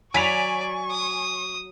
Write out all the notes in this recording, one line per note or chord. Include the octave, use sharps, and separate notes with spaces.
F#3 D5 G#5 C#6 B6 F7
D#6